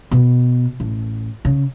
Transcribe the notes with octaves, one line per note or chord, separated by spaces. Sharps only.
B2
A1
C#3